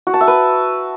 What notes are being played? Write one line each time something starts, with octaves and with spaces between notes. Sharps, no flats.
F#4
A5
E5
B4